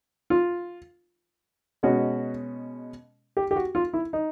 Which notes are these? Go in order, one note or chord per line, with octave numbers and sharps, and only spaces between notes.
F4
B2 G#3 C#4 F#4
G4
G4
F#4
F4
E4
D#4